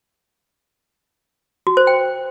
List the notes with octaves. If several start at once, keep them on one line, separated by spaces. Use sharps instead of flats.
F#4
C5
G5